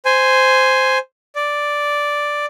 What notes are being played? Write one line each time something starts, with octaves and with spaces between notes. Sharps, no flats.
C5 G#5
D5